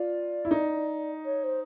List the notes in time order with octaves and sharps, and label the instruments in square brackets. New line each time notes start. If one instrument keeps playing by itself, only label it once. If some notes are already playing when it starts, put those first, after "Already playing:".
Already playing: [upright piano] F4 [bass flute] D5
[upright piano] E4
D#4
[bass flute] C#5
C5